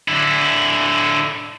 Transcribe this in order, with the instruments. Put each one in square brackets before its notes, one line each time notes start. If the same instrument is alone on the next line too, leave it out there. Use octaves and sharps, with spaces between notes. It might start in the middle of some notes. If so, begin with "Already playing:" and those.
[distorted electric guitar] D3 E4